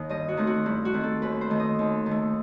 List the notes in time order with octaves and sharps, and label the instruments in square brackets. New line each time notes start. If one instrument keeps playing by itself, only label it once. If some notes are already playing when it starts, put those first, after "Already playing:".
Already playing: [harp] D#2 D#3
G2 D#5
F#4
D#3 A3 C4
F#4
G2 E4
F#4
D#3 A3 C4
A4
D#2 B4
C5
D#3 A3
D#5
D#2
D#3
A3